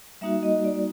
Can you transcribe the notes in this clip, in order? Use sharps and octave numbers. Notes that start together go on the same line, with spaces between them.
G3 A#3 D#4 F#4 E5
D#5
D5